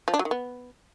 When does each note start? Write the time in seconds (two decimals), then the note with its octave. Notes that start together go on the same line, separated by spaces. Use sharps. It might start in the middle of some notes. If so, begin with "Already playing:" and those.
0.08 F3
0.14 D4
0.19 F#3
0.25 D#3
0.31 B3